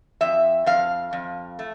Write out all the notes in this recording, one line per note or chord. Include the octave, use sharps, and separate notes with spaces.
F2 E5
F2 F5
F2
A3